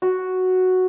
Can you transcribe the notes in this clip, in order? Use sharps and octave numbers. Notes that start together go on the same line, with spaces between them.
F#4